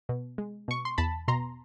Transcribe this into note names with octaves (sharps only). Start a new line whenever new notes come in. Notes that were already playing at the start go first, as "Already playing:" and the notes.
B2
G#3
B2 C#6
C6
E2 A5 B5
B2 A#5 C6